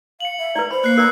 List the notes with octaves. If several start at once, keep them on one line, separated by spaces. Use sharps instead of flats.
F5 C#7 F#7
E5
B4 D5 A#5
C5 B5
A#3 F#6 C7
A#4 B4 D5 A#5 F#6